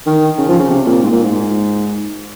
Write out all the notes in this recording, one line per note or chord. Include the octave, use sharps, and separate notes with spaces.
D#3
C#3
F3
C#3
C3
A#2
G#2
A#2
G#2